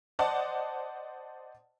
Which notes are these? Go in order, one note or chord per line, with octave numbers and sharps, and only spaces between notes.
C5 D5 D#5 F#5 A5